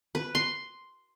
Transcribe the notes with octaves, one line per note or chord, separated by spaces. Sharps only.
B4
C6